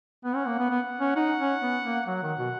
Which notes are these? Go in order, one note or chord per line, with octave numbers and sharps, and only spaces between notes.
B3 F#5
C#4
A#3
B3
B3
C#4
D#4 F#5
C#4
B3
A#3
F#3 F#5
D#3
B2